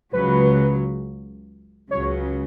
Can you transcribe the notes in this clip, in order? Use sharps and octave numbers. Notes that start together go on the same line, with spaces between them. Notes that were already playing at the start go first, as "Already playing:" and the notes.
C#2 C#3 F#3 B4
C#2 C#3 F#3 C#5